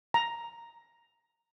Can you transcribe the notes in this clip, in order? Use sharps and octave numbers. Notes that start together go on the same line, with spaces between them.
A#5